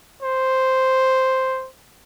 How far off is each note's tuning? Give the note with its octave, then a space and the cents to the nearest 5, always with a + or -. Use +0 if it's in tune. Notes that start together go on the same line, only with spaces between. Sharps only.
C5 +0